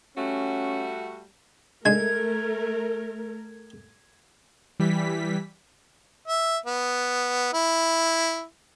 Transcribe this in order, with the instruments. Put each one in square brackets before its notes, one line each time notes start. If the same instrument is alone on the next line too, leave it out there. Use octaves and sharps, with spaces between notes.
[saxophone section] G3 A3 F#4 [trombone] C#4
[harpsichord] G#3 D4 [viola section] A3 A#4 [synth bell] G#6
[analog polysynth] E3 G3 B6
[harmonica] E5
B3
E4